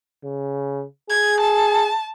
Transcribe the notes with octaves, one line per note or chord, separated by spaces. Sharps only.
C#3
G#4 G#6
A5